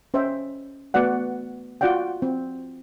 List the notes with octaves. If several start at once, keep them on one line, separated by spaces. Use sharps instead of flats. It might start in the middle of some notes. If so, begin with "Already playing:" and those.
C#4 C5 D#5 E5 G5
A3 B3 F#4 D5 F#5
F4 F#4 D5 F#5 G5
C4